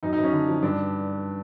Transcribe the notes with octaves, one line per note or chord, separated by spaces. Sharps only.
F#2 D#4
D#4
F#2 C#4
D3
F3
G2 D4